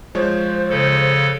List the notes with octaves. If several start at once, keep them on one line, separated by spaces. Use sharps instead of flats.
F3 G#3 C5 C#5
C#3 A4